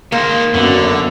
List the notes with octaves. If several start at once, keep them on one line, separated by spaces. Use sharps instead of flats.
D#3 A#3 C5
F#2 D3 B3 F#4